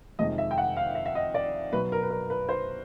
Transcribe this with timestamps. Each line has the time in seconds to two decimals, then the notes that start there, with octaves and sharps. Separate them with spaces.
0.19 F2 C3 D#3 G#3 D#5
0.38 E5
0.51 G5
0.58 F#5
0.77 F5
0.95 E5
1.06 E5
1.15 D#5
1.34 D5
1.72 B2 F#3 B4
1.92 A#4
2.03 B4
2.10 A#4
2.30 B4
2.49 C5